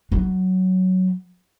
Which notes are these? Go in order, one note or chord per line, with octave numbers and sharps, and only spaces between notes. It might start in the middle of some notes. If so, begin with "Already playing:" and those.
F#3